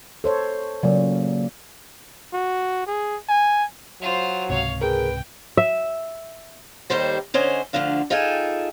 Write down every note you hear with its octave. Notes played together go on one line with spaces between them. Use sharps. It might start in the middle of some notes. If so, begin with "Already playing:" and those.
A4 C5 C#5
A#2 C#3 F#3
F#4
G#4
G#5
F#3 F4 C5
C#2 G#2 C3 C#5 F5
G#4 A#4 B4 G5
E5
D#2 D#3 G3 A4 C5 A5
D3 C#4 C5 D#5 G#5
D2 D3 D#3 F3 D4 F5
D#4 F4 G#4 A4 G5 G#5